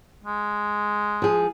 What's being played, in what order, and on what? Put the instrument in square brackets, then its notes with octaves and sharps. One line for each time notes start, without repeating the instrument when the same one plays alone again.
[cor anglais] G#3
[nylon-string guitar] F3 G#4